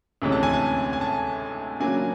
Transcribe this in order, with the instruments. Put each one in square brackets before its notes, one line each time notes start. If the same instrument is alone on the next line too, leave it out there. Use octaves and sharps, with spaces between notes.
[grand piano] D2 C3 E3 G#3 C#4
A5
G#5
A5
G#5
A5
C#3 F#3 A#3 D4 G#5